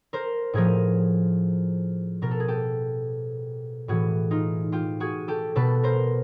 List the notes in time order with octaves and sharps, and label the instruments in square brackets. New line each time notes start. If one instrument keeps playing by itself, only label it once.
[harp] A#4 C5
A2 F3 G#4 A#4
B2 A#4
A4
G#4
G4 A4
A2 E3 F#4 G#4
D#4 F4
F4 G4
F#4 G#4
G4 A4
B2 A4 B4
A#4 C5